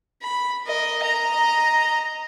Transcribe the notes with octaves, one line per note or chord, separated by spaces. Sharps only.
B5
A#4 D#5
D#5 A#5